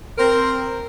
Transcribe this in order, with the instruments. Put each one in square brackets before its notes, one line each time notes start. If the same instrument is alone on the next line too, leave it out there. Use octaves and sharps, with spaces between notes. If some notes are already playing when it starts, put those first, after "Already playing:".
[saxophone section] C4 A#4